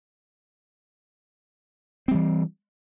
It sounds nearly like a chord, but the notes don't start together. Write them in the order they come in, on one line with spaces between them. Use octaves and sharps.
C4 G3 E3